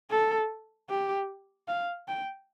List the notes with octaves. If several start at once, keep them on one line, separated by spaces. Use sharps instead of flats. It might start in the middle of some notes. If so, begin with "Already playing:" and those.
A4
G4
F5
G5